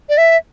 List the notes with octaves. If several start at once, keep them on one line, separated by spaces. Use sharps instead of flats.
D5
E5